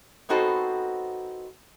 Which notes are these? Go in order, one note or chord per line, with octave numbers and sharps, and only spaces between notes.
B3 C4 D#4 F#4 A4 C5